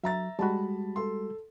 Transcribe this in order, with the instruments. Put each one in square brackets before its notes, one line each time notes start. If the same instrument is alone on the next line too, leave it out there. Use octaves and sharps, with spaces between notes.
[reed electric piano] F#3 [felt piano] E5 A#5 A6
[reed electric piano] G3 G#3 F#4 [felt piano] A5 B5
[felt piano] A4 C6